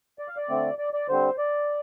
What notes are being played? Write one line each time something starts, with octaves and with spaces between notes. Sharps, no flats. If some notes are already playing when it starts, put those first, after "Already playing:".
D5
F5
D5
D3 A3 C4
D5
D5
D3 G3 C4 C5
D5